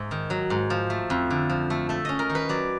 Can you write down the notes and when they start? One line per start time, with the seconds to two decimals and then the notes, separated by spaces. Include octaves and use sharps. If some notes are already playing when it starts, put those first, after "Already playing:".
Already playing: G#2 E5
0.11 D#3
0.30 F#3
0.50 G#2
0.70 F3
0.90 A3
1.10 F2
1.30 D3
1.49 F3
1.70 A3
1.89 A3 E5
2.05 C#4 D#5
2.19 A#4
2.30 D#3
2.35 B4
2.49 F#3 D5